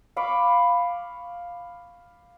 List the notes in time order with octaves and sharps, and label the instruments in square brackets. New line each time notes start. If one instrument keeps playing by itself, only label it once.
[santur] F5 B5 C#6 D6